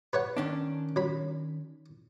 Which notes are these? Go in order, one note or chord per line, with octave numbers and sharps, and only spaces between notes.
B4 C#5 F#5
D#3 C#4 D4
F#3 B5